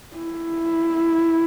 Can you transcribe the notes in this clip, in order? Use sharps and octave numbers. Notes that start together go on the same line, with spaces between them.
E4